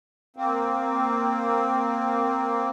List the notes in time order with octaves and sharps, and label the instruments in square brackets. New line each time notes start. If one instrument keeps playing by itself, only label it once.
[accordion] A#3 C4